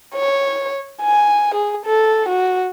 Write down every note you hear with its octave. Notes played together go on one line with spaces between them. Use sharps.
C#5
G#5
G#4
A4
F#4